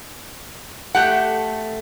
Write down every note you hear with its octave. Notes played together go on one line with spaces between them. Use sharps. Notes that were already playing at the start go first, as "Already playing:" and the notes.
A3 G4 F#5